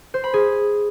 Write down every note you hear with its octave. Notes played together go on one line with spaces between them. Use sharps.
C5
B5
G#4